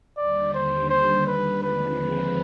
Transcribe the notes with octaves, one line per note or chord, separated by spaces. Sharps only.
D#2 D3 G3 D5
C5
C5
B4
D#2 D3 F3 G#3 C4 B4